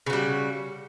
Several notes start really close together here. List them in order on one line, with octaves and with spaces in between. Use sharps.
C#3 F#4 G3